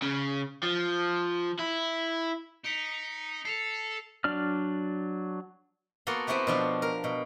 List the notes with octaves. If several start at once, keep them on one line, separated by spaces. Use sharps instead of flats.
C#3
F3
E4
D#4 B6 C#7 D7
A4 C7 E7 F7
F#3 D4 D5 F6
A#3 B3 F#4 A4 C6
B3 C4 E4 F#4 G4
B2 F3 D4
A#4
B2